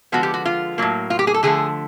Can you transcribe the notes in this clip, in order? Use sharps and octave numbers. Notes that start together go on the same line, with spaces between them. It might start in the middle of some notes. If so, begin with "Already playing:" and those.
D3 F3 G#3 B3 F#4
G4
F#4
F4
A2 F#3 A#3
F4
G4
G#4
A4
D3 F3 A3 G#4